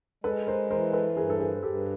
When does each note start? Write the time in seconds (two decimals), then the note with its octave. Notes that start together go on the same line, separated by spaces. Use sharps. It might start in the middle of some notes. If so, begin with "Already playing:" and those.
0.24 G#3 A4 B4
0.47 A#4 C5
0.71 E3 A#4 C5
0.93 A4 B4
1.17 G2 G#4 A#4
1.30 A4
1.40 G#4
1.63 G2 G4 A4